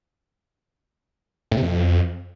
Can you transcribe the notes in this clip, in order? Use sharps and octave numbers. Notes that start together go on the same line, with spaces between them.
A2
C3
F2